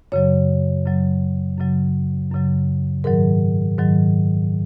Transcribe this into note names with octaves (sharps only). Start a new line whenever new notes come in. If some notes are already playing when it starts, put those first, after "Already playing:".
F#2 C#3 F#3 C#5
F#2 C#3 F#3
F#2 C#3 F#3
F#2 C#3 F#3
G#2 D#3 F#3 A#4
G#2 D#3 F#3